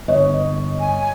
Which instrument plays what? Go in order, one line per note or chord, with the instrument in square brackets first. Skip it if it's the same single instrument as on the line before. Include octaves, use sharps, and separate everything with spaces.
[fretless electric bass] G1 [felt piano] C#5 D#5
[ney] G#5